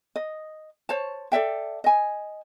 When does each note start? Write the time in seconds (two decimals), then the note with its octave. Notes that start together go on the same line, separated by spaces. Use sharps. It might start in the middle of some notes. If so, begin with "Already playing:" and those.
0.16 D#5
0.89 C5 C#5 A5
1.32 A4 D5 E5 G5
1.84 D#5 G#5